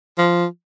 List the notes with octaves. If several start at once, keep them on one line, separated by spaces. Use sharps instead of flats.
F3